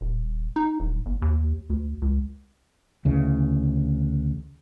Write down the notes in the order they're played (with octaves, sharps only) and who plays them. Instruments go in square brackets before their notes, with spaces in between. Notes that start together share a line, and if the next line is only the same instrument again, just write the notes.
[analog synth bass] D#1
D#4
D#1
G1
D#2
D2
C#2
[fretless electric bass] D2 C#3 E3